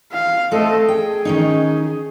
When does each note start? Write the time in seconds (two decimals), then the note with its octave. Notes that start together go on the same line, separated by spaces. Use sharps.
0.12 F5
0.52 A3 C4 A4 D#5
0.88 G#4 G5
1.25 D#3 C#4 D#4